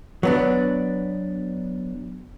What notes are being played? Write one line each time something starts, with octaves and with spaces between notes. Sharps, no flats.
F#3 B3 D4